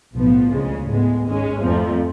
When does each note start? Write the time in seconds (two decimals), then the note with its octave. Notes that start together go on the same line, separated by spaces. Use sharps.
0.15 B1 A2 F3 B3
0.52 D2 C#3 G#3
0.89 A2 G#3 B3
1.25 G#1 G#2 G#3 C#4
1.62 F2 F3 A3